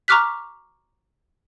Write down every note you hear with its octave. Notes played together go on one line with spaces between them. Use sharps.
A#5 C#6 D6 F6 F#6 B6